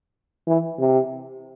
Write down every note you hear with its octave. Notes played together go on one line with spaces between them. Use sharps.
E3
C3